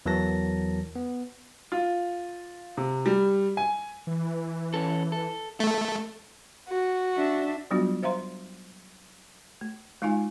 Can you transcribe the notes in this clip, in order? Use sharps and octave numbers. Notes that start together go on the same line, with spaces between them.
E2 E3 F#3 A#4 A5 A#6
B3
F4
C3
G3
G#5
E3
C#4 A4
A4
A3 A4
F#4
D4 E5
F#3 G3 B3 D4 F4 F#4
C5 E5 F5 A#5 C6
A3
G#3 D#4 F4 F5 G#5